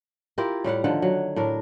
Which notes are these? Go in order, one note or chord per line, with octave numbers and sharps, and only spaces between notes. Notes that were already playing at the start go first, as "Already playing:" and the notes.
E4 F4 G4 A#4
A2 G3 F5 F#5
D3 D#3 F3 F#5
F#3
A2 D4 A#4